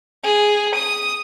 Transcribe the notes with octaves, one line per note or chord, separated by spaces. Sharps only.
G#4
D#6